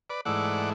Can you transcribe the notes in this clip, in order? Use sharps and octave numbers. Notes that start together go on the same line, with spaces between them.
B4 D5
G#2 E3 A3 D5 F#5